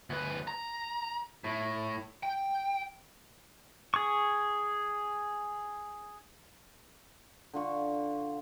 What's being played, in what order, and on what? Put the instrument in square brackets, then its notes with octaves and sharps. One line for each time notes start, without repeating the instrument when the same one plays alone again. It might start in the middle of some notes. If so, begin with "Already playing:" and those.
[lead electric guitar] D2 B4
A#5
A2
G5
[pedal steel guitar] G#4 C#6
[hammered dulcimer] D3 F4 C#6